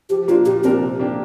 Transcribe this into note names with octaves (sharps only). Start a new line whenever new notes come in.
F3 G4
A#3 D4 F4
A#2 G4
F3 C4 D4 A#4
C3
A#3 D4 G4